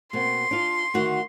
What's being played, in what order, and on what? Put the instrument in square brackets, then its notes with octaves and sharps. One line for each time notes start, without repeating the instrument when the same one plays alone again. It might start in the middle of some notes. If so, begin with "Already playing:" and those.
[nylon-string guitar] B2 A#3 C4 [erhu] C6
[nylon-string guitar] D4 F4
D2 D#3 F#4